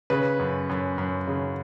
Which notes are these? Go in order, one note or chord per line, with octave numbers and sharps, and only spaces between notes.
C#3 B4
F#2
F#2
F#2
C#3